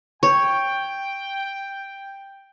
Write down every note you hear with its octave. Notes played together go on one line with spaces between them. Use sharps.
C#5 G5